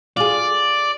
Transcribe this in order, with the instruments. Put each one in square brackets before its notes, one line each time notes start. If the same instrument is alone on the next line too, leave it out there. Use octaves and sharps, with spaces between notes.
[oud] F4 G#4 [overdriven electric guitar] D5